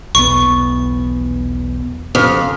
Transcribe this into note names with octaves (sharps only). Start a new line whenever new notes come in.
B1 E2 B3 C#6
F2 C#3